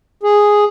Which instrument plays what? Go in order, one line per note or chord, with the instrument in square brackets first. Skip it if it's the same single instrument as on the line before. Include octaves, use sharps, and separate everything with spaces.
[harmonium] G#4